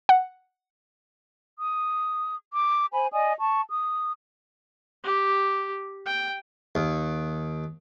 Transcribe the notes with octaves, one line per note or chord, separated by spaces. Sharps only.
F#5
D#6
D6
C5 G#5 B5
D5 D#5 G#5 D#6
A5 C#6
D#6
G4
G5
D#2